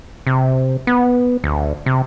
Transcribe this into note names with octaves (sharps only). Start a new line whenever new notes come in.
C3
B3
D2
C3